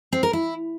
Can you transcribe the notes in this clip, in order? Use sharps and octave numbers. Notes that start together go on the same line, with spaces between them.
C4
A#4
E4